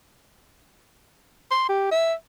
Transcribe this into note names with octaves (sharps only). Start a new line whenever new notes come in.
C6
G4
E5